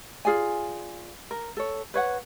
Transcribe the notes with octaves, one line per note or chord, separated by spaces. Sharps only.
F4 G#4 D5 G#5
A#4
A4 C#5
B4 C#5 F#5